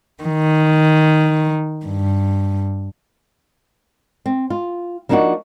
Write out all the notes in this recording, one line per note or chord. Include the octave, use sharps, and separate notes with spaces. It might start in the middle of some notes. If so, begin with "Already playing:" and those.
D#3
G2
C4
F4
F3 A#3 D4 D#4 F4 F#4